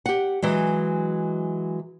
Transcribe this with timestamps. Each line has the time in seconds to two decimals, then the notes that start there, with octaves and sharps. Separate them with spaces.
0.06 G4 F#5
0.42 E3 F#3 G#3